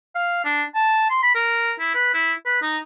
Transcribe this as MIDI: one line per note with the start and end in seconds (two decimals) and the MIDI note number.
0.15 0.40 77
0.44 0.63 62
0.75 1.06 81
1.10 1.20 84
1.23 1.34 83
1.35 1.73 70
1.79 1.92 64
1.94 2.10 71
2.14 2.33 64
2.45 2.61 71
2.61 2.78 63